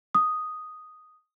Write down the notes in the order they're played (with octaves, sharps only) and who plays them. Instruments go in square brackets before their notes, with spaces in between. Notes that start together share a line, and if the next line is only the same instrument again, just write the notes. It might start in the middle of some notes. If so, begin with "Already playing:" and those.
[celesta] D#6